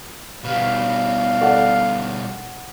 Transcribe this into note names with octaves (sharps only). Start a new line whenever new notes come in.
B2 G3 F5
A4 D5 F#5